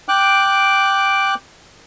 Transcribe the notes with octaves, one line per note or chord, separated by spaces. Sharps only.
G5 D6 F#6